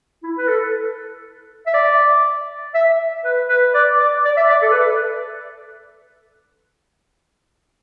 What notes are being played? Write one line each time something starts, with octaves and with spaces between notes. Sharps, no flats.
E4
B4
A4
E5
D5
E5
B4
B4
D5
D5
D5
E5
D5
A4
B4
A4